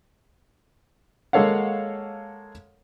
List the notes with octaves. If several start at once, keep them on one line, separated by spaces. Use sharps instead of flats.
G#3 A#3 A4 C#5 F5 F#5